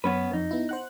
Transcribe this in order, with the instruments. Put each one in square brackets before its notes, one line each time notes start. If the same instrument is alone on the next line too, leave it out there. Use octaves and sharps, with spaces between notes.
[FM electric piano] F#2 [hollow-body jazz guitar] B3 C#4 B4
[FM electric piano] F2 [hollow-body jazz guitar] D#4
[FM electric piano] B3 E4
C5 F#5 F#6